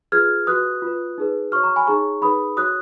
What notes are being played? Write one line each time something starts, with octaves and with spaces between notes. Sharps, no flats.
F4 G#4 B4 F6 G#6
F#4 B4 D#6 F#6
F4 B4
D#4 G#4 B4
F#4 C#5 C#6 F6
A#5 C#6
G#5 B5
D#4 G#4 C#5 A#5 C#6
D#4 G#4 B4 B5 D#6
F#4 C#5 D#6 F#6